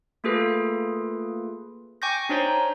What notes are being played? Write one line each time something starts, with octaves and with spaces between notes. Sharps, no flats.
A3 A#3 F4 G#4 A4 B4
G5 G#5 C#6 D6 G6 A#6
D4 D#4 C5 C#5 G#5 A#5